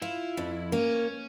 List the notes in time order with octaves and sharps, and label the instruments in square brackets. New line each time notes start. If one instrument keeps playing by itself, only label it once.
[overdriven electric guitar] E4 [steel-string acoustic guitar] F4
[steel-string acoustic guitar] F2
[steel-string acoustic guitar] A#3 [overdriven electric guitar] C#4